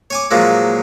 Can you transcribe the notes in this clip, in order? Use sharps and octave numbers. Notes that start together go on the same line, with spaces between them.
C#5 G#5 D6
A#2 F3 F#3 G#3